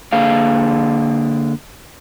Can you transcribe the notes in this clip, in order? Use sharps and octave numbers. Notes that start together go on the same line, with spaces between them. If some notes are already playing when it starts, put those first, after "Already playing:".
D3 A#3 G#4 F5